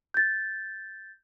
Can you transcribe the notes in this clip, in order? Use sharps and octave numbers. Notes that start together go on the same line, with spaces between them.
G6 A6